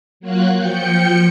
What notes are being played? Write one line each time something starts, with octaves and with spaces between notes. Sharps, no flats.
F#3 A#3 F4 F#4 F#6
F3 G5 G6 C#7